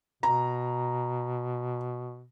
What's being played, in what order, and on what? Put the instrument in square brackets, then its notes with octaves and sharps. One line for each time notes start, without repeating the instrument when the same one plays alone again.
[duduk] B2 [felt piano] A#5